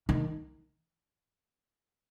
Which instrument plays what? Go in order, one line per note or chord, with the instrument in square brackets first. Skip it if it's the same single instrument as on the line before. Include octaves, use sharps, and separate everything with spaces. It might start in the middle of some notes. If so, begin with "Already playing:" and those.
[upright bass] D#3